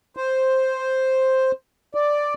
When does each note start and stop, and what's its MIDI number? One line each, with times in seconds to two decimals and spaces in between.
0.17 1.52 72
1.95 2.34 74